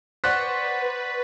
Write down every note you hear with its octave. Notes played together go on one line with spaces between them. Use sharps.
B4 C5 D5 F#5 C#6 F#6 A6 B6